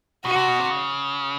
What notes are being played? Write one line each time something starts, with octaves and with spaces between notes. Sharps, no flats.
B2 F#4
C3
B2
C3
C#3